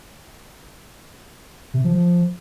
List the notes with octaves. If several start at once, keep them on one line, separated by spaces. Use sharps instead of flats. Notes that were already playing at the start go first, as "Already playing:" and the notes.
C3
F3
F3